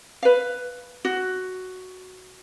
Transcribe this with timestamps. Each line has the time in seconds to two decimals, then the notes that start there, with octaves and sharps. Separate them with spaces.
0.23 B4 F5
1.05 F#4